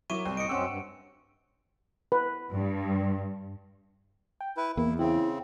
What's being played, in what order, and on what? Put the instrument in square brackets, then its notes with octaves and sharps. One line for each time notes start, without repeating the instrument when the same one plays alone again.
[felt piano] F#3 A#4 [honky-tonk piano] E4 D6 [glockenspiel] C#6 D#7
[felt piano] C2 [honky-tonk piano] C4
[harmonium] A2 D#5 [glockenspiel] C#7 D7
[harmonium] F#2 C4 C#4 [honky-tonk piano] F#5 E6 [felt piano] D6
[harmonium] G2
[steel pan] B4
[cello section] G2
[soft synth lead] G5
[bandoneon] E4 B4
[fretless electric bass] E2 [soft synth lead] A#3 [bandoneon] E4
[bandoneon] C#3 C4 [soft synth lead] E4